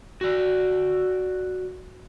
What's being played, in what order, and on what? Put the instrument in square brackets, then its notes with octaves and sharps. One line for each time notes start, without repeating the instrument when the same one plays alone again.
[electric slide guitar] F#4 D5